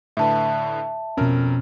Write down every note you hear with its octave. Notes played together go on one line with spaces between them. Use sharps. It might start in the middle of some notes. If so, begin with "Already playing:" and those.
A2 D3 B4 E5 A5
F2 B2 C#4 A#4 F6